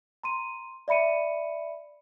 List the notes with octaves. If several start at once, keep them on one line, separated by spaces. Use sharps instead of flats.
A#5 C6 D#7
D5 E5 B5 C#7 D#7